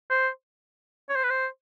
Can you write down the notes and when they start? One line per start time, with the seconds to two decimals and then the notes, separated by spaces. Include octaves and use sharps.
0.10 C5
1.09 C#5
1.16 C5
1.23 B4
1.30 C5